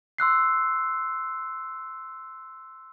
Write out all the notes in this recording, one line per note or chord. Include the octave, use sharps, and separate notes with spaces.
C6 E6 F#6 C7